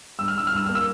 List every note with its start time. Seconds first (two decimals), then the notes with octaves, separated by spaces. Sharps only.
0.19 G2 E6
0.28 F6
0.35 G2 E6
0.47 F6
0.52 G2 E6
0.66 A#3 F6
0.75 E6